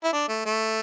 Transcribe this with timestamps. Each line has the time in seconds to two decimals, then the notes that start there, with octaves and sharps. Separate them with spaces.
0.04 E4
0.12 D4
0.28 A3
0.45 A3